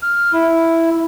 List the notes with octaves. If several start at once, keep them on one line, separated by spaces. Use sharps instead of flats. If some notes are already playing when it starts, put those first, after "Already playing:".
F6
E4